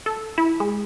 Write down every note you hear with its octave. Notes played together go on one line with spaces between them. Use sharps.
A4
E4
G#3